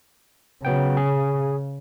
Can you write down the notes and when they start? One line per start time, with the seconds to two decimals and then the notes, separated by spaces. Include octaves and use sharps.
0.65 C#3 F#3 B3 G5
0.97 G#4